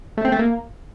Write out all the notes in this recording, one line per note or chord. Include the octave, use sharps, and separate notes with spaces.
A3
C4
A3
A#3